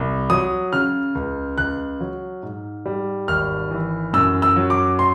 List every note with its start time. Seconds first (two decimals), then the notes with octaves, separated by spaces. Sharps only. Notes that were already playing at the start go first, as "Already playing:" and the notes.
Already playing: C2
0.30 F#3 D#6
0.73 C#3 F6
1.15 C#2
1.58 C#2 F#6
2.00 F#3
2.43 G#2
2.86 G3
3.28 G#1 F6
3.71 E3
4.13 F#2 E6
4.42 E6
4.56 F#3
4.70 D6
4.99 C6